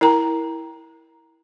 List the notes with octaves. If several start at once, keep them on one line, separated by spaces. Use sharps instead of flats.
E4 A#4 G5 A#5